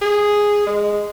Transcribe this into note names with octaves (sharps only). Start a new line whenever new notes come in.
G#4
G#3